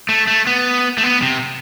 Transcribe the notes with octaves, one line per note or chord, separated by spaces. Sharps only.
A3
A3
B3
A3
B3
C3